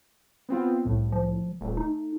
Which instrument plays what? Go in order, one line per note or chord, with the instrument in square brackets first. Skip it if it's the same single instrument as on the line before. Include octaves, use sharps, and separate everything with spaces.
[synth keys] B3 C4 F4
C2 A2
[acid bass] F3
[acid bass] D#1 [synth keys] A3
[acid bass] D#4